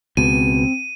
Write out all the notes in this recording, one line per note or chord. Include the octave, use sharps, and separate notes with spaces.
C#2 B2 C4 D#7